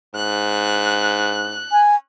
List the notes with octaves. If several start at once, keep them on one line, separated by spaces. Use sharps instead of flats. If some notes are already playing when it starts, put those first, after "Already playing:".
G#2 F#6
G#5